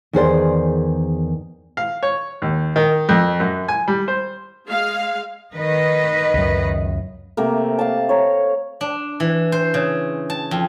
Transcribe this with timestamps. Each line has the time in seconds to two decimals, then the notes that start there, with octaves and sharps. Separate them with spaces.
0.13 E2 D#3 G#4 A#4 C5 D5
1.77 F5
2.03 C#5
2.42 D#2
2.76 D#3
3.09 F2
3.40 F#2
3.68 G#5
3.88 G3
4.08 C5
4.69 G#3 F5
5.54 D#3 B4 D#5
6.34 C#2 F#2
7.37 C3 A3 A#3
7.79 F5 A5
8.09 C#5 A#5
8.81 D4
9.20 E3
9.52 C5
9.74 C#3
10.30 A5
10.51 F2